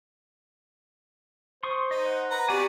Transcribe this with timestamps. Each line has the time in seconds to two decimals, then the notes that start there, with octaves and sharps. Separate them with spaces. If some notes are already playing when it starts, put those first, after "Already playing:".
1.63 C5 C6 C#6 D#6
1.91 D#4 D#5
2.06 F#5
2.30 B4 A#5
2.49 B3 C4 F#4 G4 D5 G#5